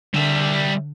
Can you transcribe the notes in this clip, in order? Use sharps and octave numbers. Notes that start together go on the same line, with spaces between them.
D3 G3 E5